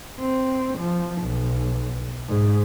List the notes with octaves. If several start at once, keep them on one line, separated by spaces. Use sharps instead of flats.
C4
F3
B1
G#2